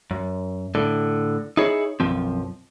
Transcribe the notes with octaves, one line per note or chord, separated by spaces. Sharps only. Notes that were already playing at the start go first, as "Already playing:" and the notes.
F#2
A2 D3
D#4 E4 G#4 C#5
B1 F#2 F3 C4